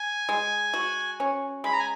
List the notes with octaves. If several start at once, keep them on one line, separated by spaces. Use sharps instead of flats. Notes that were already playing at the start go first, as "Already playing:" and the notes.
Already playing: G#5
G#3
F#4
C#4
G#3 B5
A#5
G#5